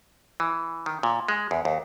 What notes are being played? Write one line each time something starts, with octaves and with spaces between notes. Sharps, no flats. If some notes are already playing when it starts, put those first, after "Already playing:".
E3
D#3
A#2
G#3
E2
D#2